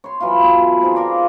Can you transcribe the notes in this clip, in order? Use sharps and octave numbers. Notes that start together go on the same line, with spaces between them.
C#5 C6
E3 F#3 E4 F4
A3 B3
B4
C4 D#4 G#4
F4 A#4 D5